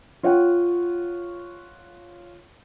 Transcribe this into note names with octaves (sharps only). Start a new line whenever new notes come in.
F4 C#5 F#5 G5